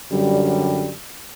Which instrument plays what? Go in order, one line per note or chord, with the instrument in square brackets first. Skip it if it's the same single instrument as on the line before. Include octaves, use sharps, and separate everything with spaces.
[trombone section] F#2 D3 G3